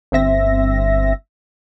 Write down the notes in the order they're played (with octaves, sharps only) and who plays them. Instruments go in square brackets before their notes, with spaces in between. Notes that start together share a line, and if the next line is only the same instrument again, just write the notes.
[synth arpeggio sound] G1 C4 E5 A#6